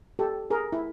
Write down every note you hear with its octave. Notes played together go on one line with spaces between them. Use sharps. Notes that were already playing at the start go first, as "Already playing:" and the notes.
G4 A4
G#4 A#4
E4